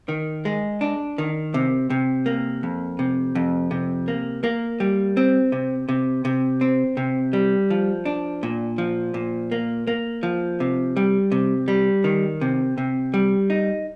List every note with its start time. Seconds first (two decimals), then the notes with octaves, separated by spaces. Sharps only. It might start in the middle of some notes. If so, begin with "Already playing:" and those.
0.08 D#3
0.45 G#3
0.81 D4
1.18 D#3
1.54 C3
1.90 C3
2.26 A#3
2.63 F2
2.99 C3
3.35 F2
3.71 C3
4.08 A#3
4.44 A#3
4.80 G3
5.17 C4
5.52 C3
5.89 C3
6.25 C3
6.61 C4
6.97 C3
7.33 G3
7.70 F3
8.05 D4
8.43 A#2
8.78 F3
9.14 A#2
9.52 A#3
9.87 A#3
10.23 F3
10.60 C3
10.97 G3
11.32 C3
11.68 G3
12.04 D#3
12.41 C3
12.78 C3
13.14 G3
13.50 D#4